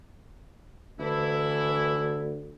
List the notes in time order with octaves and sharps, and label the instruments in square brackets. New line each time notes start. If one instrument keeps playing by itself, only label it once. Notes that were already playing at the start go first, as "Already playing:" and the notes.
[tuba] D2 [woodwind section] E3 D4 E4